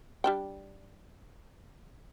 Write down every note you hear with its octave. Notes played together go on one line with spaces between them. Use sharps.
G3 D4 G5